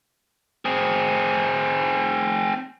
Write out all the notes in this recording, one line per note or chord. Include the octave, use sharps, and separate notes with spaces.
C4 G#4